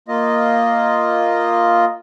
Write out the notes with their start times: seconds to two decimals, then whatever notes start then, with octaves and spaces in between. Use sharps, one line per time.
0.08 A#3 F4 D#5